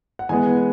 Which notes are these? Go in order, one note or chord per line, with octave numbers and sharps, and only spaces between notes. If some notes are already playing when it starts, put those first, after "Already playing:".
F#5
E3 G#3 B3 G#5